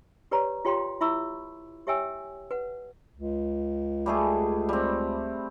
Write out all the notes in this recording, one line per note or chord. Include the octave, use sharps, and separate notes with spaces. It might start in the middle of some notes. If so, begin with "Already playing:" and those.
G4 B4 C#5 D5 A#5
F4 G4 C#5 F5 G5 C6
E4 E5 B5 C#6 E6
G4 C#5 E5 G5 G#5 E6
B4 F#5
C#2
G3 A3 G#4
G3 C4